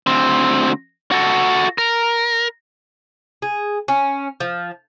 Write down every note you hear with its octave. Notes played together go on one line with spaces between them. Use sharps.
D2 C4
F#4 A4
A#4
G#4
C#4
F3